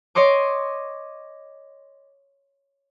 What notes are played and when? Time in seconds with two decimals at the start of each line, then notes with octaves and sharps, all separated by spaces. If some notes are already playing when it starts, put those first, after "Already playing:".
0.15 C#5 D#5 C6 D6